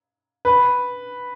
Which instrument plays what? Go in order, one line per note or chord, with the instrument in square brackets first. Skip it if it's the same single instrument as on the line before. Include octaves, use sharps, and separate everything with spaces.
[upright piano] B4